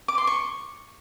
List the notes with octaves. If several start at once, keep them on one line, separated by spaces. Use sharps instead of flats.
D6
C6
C#6